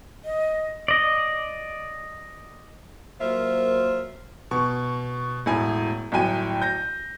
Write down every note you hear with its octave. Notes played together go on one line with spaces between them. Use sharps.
D#5
D5 D#5
F#3 A#3 F4 A#4 C5 E5
B2 C#6
E1 A2 G#5
G1 A2 F#3 G5 G#5 D#7
G6 A#6